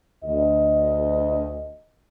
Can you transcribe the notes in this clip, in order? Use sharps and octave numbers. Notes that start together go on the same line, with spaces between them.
D2 D#5